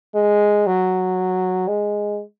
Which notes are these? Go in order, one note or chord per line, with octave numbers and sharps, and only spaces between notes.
G#3
F#3
G#3